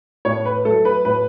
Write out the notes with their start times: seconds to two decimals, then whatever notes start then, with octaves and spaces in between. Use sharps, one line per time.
0.25 A2 C#5
0.45 B4
0.65 F#3 A3 A4
0.85 B4
1.05 A2 B4